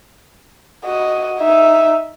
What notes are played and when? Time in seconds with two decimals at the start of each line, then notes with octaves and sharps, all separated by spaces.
0.84 F#4 D#5
1.39 D#4 E5